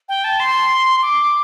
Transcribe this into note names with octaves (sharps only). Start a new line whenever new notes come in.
G5
A5
C6
D6